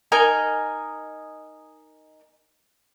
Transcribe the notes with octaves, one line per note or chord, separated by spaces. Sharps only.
D#4 A#4 D#5 G#5